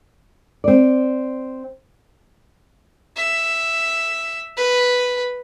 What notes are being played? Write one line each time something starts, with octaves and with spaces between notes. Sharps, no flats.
C4 D5
E5
B4